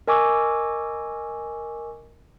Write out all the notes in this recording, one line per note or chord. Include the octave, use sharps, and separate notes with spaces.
A#4 D#5 G#5 C#6 D6 E6